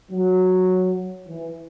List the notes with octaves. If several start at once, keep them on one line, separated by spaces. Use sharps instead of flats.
F#3
E3